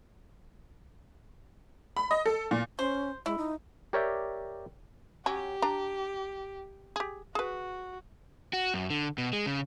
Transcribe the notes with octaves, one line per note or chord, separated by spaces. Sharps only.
B5
D#5
A4
A#2
C#4 C5
G#3 E4
D#4
G4 A#4 C#5 D5 E5 G5
F#3 C#4 G4
D4 A#5
G4 G#4
F#4 G#4 B4
F#4
F#2
D3
B2
G#3
C#3